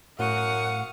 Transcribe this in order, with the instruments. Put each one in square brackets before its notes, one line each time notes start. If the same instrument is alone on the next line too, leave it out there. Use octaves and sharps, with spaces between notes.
[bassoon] F#2 [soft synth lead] A2 [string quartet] F5 C#6 D#6 [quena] F#5